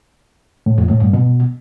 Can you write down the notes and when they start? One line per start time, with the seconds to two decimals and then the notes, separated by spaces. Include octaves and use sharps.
0.66 A2
0.78 F2
0.90 A2
1.02 G2
1.13 B2